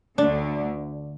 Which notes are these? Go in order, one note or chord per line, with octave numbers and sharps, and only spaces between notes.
D2 D3 A3 D4